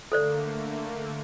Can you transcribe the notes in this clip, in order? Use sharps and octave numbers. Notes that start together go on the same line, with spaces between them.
D3 A3 A#3 A4 C5 D5